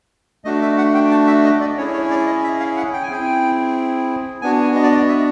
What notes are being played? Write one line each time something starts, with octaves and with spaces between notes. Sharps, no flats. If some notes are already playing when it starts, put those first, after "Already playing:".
A3 D4 F#4 D#5
E5
F#5
G5
A5
E5
D#5
D5
C#4 E4 G#4 C#5
C#5
D5
D#5
E5
F5
F#5
G5
G#5
C4 E4 G#4 G5
B3 D4 F#4 G#5
D#5
D5
D#5
E5